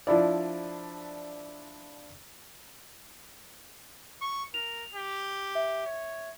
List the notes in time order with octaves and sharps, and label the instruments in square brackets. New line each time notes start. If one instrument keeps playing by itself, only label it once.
[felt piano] F3 D4 E4 D5
[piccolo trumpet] C#6
[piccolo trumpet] A#4 [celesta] F7
[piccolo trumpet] G4
[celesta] E5
[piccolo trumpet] C#5